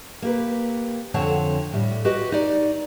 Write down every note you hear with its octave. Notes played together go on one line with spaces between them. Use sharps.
A#3 G4 B4
F2 D3 C4 C#5 F#5 A5
A2 G3
F#4 G4 B4 D#5
D#4 D5